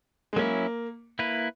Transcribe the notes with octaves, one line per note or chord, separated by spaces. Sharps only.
G#3
F#3 A#3 C#4 E4
A#3 E4 B4